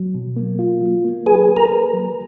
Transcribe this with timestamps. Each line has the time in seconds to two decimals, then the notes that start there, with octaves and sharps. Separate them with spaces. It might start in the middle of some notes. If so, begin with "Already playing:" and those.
Already playing: F#3
0.15 B2
0.36 A#3
0.59 F4
0.81 F#3
1.04 A#3
1.26 G#4 B4 G#5
1.49 A#3
1.57 A#4 A#5
1.72 B4
1.93 F#3